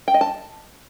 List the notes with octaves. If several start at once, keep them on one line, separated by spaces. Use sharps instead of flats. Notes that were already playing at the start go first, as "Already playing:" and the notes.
G5
D#5
A5